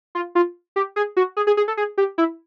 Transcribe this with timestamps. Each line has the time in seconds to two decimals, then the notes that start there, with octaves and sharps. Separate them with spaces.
0.15 F4
0.35 F4
0.76 G4
0.96 G#4
1.17 F#4
1.37 G#4
1.47 G#4
1.57 G#4
1.68 A4
1.77 G#4
1.98 G4
2.18 E4